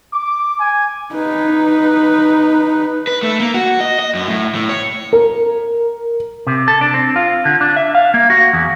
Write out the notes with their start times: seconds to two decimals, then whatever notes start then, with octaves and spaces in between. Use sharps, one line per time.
0.12 D6
0.59 G#5
1.13 D#4 B4
3.07 B4
3.23 A3
3.40 A#3
3.54 F#4
3.80 D#5
3.99 D#5
4.15 F#2
4.27 A2
4.55 A2
4.69 C#5
5.13 A#4
6.47 C3
6.68 A4
6.81 D4
6.94 C4
7.16 F4
7.45 D3
7.61 D4
7.76 E5
7.95 F5
8.14 A#3
8.30 F#4
8.53 E2